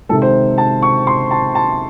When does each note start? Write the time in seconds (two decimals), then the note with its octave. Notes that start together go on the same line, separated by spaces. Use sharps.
0.09 C3 D#3 G#3 A4
0.22 C5
0.58 A5
0.82 C#6
1.07 C6
1.31 A5
1.55 A5